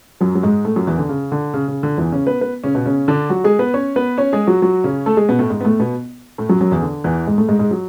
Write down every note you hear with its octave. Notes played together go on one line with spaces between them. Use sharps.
F#2 F#3
F#3
G#2 G#3
A2 A3
F#2 F#3
E2 E3
D3
C#3
D3
C#3
C#3
D3
E2 E3
C#3 C#4
B3 B4
B3 B4
C#3 C#4
B2 B3
C#3 C#4
D3 D4
F#3 F#4
G#3 G#4
B3 B4
C#4 C#5
B3 B4
C#4 C#5
G#3 G#4
F#3 F#4
F#3 F#4
C#3 C#4
A3 A4
G#3 G#4
B2 B3
A2 A3
G#2 G#3
B3
A2 A3
B2 B3
A2 A3
F#2 F#3
F#2 F#3
E2 E3
D3
E2 E3
G#2 G#3
A2 A3
G#2 G#3
G#2 G#3
F#3